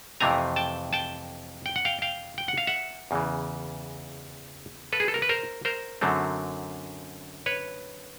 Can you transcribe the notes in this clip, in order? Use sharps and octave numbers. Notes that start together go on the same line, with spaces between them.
F2 C3 E3 A3 C4 G#5 A#5
G5 A5
G5 A5
G5
F#5
F5 G5
F5 G5
G5
F#5
F5
E5 F#5
E2 C#3 E3
A4 B4
G#4
A4
A#4
B4
A#4 C5
A#4 C5
F#2 D3 F#3 A3 C4
B4 C#5